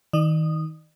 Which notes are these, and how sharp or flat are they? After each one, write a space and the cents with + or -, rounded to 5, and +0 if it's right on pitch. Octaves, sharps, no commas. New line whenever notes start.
D#3 +25 D5 +45 D#6 -15